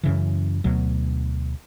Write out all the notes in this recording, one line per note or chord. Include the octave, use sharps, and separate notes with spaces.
F#2 C#3 E3
D2 B2 F#3